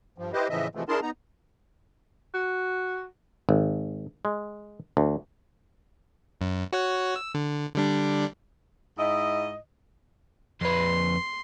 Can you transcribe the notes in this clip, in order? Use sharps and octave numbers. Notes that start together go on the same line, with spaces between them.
G2 F3
E4 G4 B4 C5 D#5
A2 C#3 E3 F3 D#5 E5
C3 E3 F3 G#3 A3
D4 E4 G#4 A#4 A5 C6
B3 D#4 A#5
F#4
G#1
G#3
D2
F#2
F#4 C#5 F#5
E6
D3
D3 G3 D4
G#2 E4 D#5
F2 B4 C6